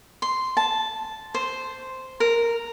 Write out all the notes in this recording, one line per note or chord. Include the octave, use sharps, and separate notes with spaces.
C6
A5
C5
A#4